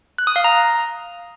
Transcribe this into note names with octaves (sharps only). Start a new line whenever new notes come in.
F#6
D#6
F5
A#5